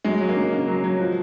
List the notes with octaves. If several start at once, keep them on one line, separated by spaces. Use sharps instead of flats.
F#3 G#3
F#3
A#3
C#3
C#3 A#3
F#3
F#3
F3